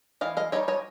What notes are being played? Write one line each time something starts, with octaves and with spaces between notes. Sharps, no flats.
E3 D#5 F5
D#5 F5
G3 A#3 D#4 C#5 D#5
C#5 D#5